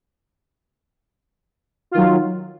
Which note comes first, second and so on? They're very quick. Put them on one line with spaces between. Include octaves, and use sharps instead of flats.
F4 D#3 F#3